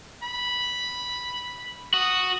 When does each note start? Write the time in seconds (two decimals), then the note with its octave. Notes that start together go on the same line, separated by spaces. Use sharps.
0.23 B5
1.94 F#4 D#6